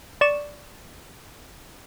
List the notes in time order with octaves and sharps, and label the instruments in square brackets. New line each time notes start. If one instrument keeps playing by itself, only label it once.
[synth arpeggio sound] D5 C#6 E7